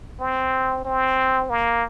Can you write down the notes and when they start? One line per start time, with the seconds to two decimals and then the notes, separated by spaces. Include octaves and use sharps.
0.20 C4
0.85 C4
1.50 A#3